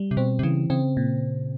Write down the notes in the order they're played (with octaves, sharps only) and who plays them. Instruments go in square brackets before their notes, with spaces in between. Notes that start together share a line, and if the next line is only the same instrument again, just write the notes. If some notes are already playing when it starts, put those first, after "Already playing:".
Already playing: [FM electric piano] G3
[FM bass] C3
[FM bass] B2 [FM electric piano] C4
[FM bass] C3
[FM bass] C#3 [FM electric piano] E3
[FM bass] C#3 [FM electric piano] C4
[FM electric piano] A#2